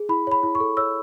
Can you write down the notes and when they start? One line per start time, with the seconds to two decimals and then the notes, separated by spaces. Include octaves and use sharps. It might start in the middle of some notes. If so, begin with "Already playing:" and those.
Already playing: G#4
0.09 E4 B5
0.27 C#5 B5
0.43 E4
0.55 C#6
0.60 A4
0.77 C#5 E6